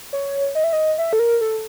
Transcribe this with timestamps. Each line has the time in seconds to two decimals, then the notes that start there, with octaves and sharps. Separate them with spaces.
0.13 C#5
0.55 D#5
0.64 E5
0.73 D#5
0.98 E5
1.13 A4
1.19 A#4
1.41 A4